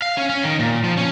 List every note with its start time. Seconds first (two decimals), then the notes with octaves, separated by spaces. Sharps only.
0.02 F5
0.17 C#4
0.30 C#4
0.43 D#3
0.59 A#2
0.84 F3
0.97 C#4